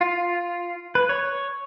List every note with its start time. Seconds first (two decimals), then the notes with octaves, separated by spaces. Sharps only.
0.01 F4
0.95 B4
1.09 C#5